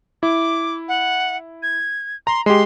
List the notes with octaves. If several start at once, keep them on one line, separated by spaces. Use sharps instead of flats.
E4 D6
F#5
G#6
A#5 C6
G#3 G4 C6